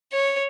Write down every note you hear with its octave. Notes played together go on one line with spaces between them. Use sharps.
C#5